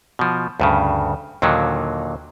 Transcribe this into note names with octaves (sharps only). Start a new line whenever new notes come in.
B2 F3
D2 G2 C#3
D#2 A#2 D3 D#3 F#3